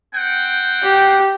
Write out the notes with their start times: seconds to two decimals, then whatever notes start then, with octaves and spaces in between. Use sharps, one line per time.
0.15 C4 F#5 G5
0.83 G4